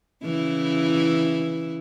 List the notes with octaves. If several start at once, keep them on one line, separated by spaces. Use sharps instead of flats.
C#3 E3 E4